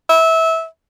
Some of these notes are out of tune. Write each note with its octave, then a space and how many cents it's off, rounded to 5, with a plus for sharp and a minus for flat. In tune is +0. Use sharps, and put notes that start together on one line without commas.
E5 -20